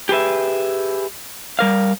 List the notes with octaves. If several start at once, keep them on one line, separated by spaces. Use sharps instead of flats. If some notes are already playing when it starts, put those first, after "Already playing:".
G4 G#4 B4 E5
G3 A#4 F5